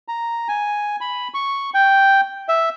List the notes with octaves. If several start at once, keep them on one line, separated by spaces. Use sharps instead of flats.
A#5
G#5
B5
C#6
G5
E5